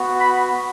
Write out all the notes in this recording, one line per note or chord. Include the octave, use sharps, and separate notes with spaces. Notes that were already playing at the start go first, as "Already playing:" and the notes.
Already playing: B3 F#4
B5